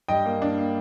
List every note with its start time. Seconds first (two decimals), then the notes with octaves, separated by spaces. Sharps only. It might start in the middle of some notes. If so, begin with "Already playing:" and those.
0.08 G2 D#5 G5
0.25 A#3
0.42 D4
0.58 A#3